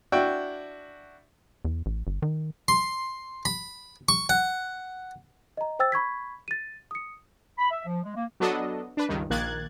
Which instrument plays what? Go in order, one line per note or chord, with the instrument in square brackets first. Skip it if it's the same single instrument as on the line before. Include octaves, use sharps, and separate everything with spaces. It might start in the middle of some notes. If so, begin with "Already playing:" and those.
[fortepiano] D4 E4 F#4 G5
[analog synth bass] E2
A1
G1
D#3
[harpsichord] C6
B5
C#6
F#5
[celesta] D#5 A#5
C5 G5 E6 A6
B5 C#6 G#6 B6
A6 D#7
D#6 C#7
[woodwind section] B5
E5
F3
G#3
A#3
[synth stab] F#3 B3 D4 F#4 A4 D#5
D4 B4
C#2 G2 D#3
A#1 D#3 A#3 F#6 G#6 A6